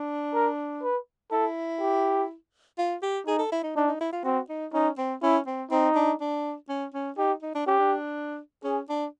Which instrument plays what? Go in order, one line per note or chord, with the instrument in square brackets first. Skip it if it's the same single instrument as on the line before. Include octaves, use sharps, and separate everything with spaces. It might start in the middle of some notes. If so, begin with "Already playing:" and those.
Already playing: [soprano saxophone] D4
[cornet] A#4
B4
[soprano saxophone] E4 [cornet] A4
[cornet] G4
[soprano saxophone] F4
G4
[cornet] D#4 [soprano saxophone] G#4
[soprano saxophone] A4
E4
D#4
[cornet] D4 [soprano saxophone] D#4
[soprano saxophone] D#4
E4
F4
[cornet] C4 [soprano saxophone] F#4
[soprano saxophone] D#4
[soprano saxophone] C#4 [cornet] D#4
[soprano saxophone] C4
[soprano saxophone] C#4 [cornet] E4
[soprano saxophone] C4
[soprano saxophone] C4 [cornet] D#4
[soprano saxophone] D4
D4
C#4
C#4
[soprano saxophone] D#4 [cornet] G4
[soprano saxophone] D#4
D4
[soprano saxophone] C#4 [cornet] G4
[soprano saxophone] D4
[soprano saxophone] C#4 [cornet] G#4
[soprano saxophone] D4